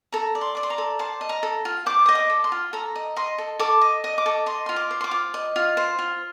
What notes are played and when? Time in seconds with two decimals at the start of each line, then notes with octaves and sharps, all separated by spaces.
0.12 A4 A#5
0.35 D5
0.41 C6
0.55 D5 D6
0.63 C6
0.70 A#5
0.78 A4
0.99 C5 A5
1.21 D#5
1.29 A#5
1.43 A4
1.65 F4
1.86 C5 D6
2.06 D#5 D#6
2.15 D6
2.30 A4
2.44 C6
2.52 F4
2.73 A4 A#5
2.96 D#5
3.16 D#5 C6
3.38 A4
3.59 A4 D6
3.81 D#5
4.04 D#5
4.18 D6
4.26 A4
4.46 D#5 C6
4.66 F4 C6
4.76 D6
4.91 C5
5.01 C6
5.04 D6
5.11 F4
5.34 D#5
5.56 F4
5.77 C5
5.99 F4